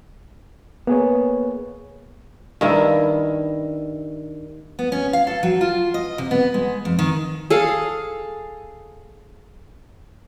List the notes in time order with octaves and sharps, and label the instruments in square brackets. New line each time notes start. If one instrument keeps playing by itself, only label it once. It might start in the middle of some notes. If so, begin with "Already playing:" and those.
[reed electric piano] A#3 G#4 C#5 [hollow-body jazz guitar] B3
[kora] G2 D#3 E4
[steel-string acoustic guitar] B3
C#4
F5
A4
F#3
F4
D#5
C3
B3
G#3
F2
D#3
[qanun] G#4 A4 F5